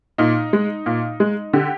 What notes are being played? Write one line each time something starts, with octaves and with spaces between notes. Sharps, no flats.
A#2 D#4
G#3
A#2
G#3
D3 G4